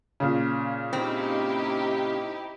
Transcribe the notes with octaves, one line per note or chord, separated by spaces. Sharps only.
A#2 C#3
C4 D#4 E4 G4